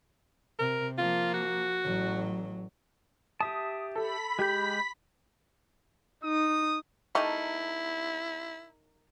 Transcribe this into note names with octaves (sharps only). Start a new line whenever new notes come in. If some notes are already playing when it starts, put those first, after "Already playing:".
C3 A#4
F3 A#3 F4
F#4
A1 F#3
G4 E5 A5 D#6
A4 B5 B6
G#3 G4 G6
D#4 D#6
A3 D#4 E4 G4 A#4 A5